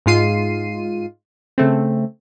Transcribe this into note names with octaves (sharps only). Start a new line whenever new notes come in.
G#2 G#3 F4 C7 D#7
C#3 A3 C4